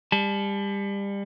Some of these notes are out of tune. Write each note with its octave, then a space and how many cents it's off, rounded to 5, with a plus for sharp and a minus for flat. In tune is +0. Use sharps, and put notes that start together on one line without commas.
G3 +30 A5 -30